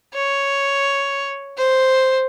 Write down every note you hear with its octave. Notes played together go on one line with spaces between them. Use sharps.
C#5
C5